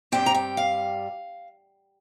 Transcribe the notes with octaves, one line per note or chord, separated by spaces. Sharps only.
G2 G3 C4 G5
A#5
G5
F5